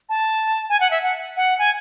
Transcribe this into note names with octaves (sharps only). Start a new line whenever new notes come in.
A5
G#5
F#5
E5
F#5
F#5
G#5